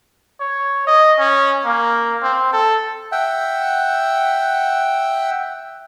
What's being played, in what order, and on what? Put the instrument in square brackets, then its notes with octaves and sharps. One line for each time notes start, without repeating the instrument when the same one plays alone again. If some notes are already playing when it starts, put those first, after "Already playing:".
[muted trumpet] C#5
D#5
C#4
A#3
C4
A4
[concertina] E5 F#5 G5